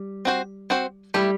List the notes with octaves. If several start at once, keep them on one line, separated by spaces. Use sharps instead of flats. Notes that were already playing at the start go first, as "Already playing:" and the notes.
Already playing: G3
C4 F#4 C5
C4 F#4 C5
G3 A3 E4 G4